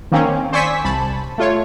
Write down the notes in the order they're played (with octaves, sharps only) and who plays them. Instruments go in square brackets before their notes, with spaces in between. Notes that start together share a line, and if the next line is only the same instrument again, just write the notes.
[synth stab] D#3 A#3 C4 C#4
C5 D5 G#5 C#6 E6 B6
C2 A5 B5
A3 F4 C#5